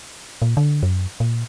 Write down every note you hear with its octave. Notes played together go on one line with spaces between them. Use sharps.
A#2
D3
F#2
A#2